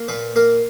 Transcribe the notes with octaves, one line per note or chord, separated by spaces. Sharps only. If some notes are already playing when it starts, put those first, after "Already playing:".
Already playing: A#3
A#2 B4
A#3 A#4